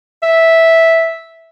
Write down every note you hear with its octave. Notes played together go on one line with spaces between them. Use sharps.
E5